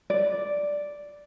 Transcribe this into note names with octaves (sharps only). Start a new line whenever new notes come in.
D5